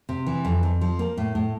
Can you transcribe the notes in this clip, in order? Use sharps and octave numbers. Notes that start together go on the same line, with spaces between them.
C3
E3
F2
F2
F3
A#3
A2
A2